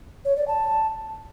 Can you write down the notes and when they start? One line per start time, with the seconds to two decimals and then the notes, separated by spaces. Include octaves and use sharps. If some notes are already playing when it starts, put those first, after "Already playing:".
0.25 C#5
0.36 D5
0.48 A5